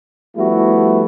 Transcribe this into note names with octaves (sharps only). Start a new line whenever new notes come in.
F3 G3 A3 B3 E4 F#4